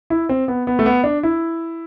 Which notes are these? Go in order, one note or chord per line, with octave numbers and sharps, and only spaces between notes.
E4
C4
B3
B3
A3
B3
D4
E4